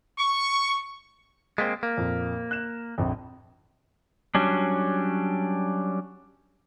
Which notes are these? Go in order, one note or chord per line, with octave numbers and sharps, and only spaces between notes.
C#6
G#3 A#3 C4 A6 B6
A#3
F2 A#2
F#6 E7
A#1 F2
F#3 G3 C#4 D4